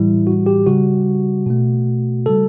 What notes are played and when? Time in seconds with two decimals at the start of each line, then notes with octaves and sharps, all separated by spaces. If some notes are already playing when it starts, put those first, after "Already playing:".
Already playing: A2 E3 G3 E4
0.27 F#4
0.46 G4
0.67 C#3 G3 F#4
1.46 B2 A3
2.26 C#3 G3 A4